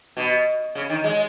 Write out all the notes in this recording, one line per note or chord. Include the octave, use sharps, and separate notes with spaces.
B2
C#3
D#3
G#3